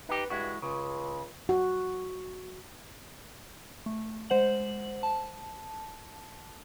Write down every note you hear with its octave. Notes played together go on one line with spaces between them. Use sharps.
D#4 G4 B4
G2 G#3 E4 F#4
C#2 C#3
F#4
A3
G#3 C5 F#5 F#7
A5